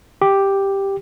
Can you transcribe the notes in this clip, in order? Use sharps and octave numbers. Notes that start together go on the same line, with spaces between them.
G4